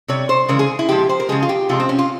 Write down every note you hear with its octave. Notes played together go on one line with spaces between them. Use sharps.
C3 G3 C#5
C5
C#3 E3 G#3 A#4
G#4
E4
A#2 F3 G#3 G4
C5
A#4
C#3 F3 G#3 G#4
F4
G4
C3 F3 G#3 F4
C4
C#4
F4